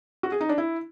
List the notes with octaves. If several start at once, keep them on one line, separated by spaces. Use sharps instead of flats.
F#4
G#4
D#4
D4
E4